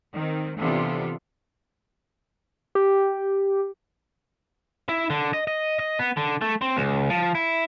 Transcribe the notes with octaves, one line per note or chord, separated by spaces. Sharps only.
D#3 C4
C3 E3 B3 D4 F4 A4
G4
E4
D3
D#5
D#5
D#5
B3
D3
A3
C4
C#2
F3
E4